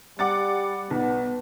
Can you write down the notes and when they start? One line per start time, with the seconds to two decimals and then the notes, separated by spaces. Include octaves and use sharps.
0.19 G3 F#5 D6 A6
0.91 B1 B3